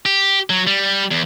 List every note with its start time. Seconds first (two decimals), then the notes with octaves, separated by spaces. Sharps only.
0.06 G4
0.50 F#3
0.67 G3
1.11 E2